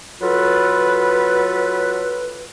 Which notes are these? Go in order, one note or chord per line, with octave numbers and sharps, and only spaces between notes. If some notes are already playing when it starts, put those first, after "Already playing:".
F#3 F4 A4 B4